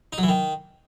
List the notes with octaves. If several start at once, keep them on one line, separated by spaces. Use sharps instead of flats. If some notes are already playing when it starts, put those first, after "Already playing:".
D#4
F#3
E3
D#3